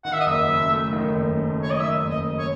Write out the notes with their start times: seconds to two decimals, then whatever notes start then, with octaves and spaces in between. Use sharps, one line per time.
0.05 D#3 F#5
0.13 E5
0.20 D#5
0.26 F#1 E5
0.48 F#2
0.71 A3
0.93 D#3
1.15 F#1
1.37 F#2
1.57 A3
1.63 C#5
1.71 D#5
1.80 D#3 E5
2.02 F#1
2.10 D#5
2.24 F#2
2.39 C#5